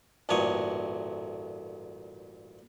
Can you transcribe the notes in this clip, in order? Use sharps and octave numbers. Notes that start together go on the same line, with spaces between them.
A1 D2 G2 A#2 C#5 D#6